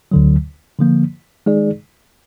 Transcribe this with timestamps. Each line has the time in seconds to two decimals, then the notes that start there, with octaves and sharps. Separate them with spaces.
0.11 D2 D3 F#3
0.79 D3 F3 A#3
1.46 D#3 G#3 D#4 G#4 D5